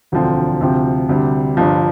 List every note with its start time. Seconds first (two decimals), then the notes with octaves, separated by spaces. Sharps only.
0.12 E1 D2 D3 F3 C4
0.60 D2 C3 F3 C4
1.09 D2 C3 G3
1.57 G1 G2 F3